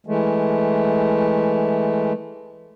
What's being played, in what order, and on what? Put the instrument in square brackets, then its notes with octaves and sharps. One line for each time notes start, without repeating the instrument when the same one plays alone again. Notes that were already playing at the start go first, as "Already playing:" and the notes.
[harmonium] E3 G#3 A3